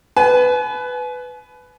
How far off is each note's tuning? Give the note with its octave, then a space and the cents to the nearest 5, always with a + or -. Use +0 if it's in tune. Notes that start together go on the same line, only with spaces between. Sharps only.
B4 +10 G#5 +45